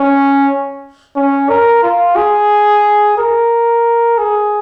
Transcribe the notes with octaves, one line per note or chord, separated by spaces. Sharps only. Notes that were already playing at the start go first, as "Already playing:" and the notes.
Already playing: C#4
C#4
A#4
F4
G#4
A#4
G#4